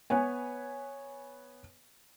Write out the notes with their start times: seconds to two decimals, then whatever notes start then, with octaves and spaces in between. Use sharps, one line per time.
0.10 B3 B4 C#5 G#5